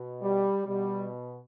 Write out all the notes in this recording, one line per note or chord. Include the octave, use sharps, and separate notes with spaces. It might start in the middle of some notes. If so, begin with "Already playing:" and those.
Already playing: B2
G3
B2 G3